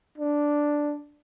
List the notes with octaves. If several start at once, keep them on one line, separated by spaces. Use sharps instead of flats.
D4